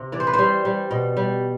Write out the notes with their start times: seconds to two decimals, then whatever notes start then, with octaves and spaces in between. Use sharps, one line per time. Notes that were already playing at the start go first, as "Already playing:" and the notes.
Already playing: C3
0.12 E3 D5
0.20 C5
0.27 B4
0.33 C5
0.39 G3
0.65 G3
0.91 B2
1.17 G3